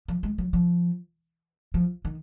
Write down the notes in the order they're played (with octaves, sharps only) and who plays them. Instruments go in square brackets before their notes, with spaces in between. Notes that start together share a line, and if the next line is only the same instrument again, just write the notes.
[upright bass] F3
G#3
F#3
F3
F3
D#3